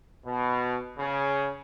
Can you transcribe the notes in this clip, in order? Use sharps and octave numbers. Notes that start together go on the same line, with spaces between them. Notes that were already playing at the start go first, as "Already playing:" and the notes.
B2
C#3